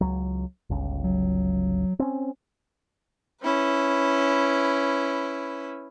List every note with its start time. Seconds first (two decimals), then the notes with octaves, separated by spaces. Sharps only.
0.01 C#2 F#3
0.70 G1 C#2
1.04 F#3
1.99 C4 C#4
3.43 C#4 E4 B4